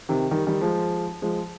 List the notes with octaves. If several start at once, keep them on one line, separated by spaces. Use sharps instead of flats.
C3 D#3
D#3 G3
D#3 G3
F3 G#3
F3 G#3